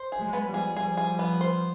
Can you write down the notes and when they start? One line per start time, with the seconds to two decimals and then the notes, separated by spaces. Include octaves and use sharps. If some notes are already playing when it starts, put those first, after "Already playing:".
Already playing: C5
0.12 G#4
0.19 F#3 G#3
0.33 B3
0.47 F3 G3
0.54 G#4
0.76 F3 G3 G#4
0.97 G#4
1.19 B3
1.41 C5